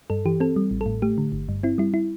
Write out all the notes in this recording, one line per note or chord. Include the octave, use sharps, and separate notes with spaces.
G2 A4
E3 G4
C4 A4
G3
A1
A4
A2
A3 G4
D3
G1
G2
C4 E4
G3 E4
E4